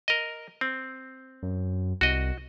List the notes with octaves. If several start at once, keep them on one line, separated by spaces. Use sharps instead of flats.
A#4 D#5
C4
F#2
C2 F#4 D#5